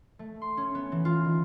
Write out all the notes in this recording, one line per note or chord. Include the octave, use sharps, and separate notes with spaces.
A3
C6
C#4
B3
E3
F4
D#3